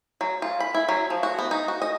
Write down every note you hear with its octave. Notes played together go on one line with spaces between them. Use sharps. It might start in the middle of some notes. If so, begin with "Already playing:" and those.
F#3
F4
B5
E4
F#3
F3
F#4
B3
D#4
F#4
D#5